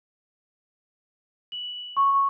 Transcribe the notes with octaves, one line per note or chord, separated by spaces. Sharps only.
F#7
C#6